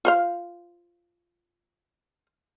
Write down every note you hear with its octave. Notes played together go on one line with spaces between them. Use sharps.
F4 C5 F5